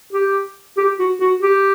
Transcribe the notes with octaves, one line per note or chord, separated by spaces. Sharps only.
G4
G4
F#4
F#4
G4